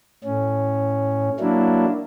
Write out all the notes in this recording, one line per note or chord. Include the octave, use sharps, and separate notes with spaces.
A2 C#4
F#3 A#3 D4 E4